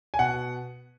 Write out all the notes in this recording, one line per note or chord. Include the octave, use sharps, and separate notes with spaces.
G#5
B2 F#5